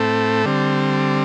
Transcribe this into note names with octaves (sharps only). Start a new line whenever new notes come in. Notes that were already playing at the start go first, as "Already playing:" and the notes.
Already playing: A2 A3 C4 A4
D3 G3 C4